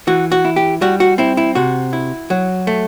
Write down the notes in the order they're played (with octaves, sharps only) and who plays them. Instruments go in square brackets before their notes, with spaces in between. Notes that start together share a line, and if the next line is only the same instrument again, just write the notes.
[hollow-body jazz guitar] E3 F#4
F#4
E4
G4
G3 F#4
F#4
C4 E4
E4
C3 F#4
E4
F#3
A3